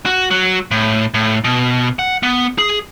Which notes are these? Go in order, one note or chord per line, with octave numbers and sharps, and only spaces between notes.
F#4
F#3
A2
A2
B2
F#5
B3
G#4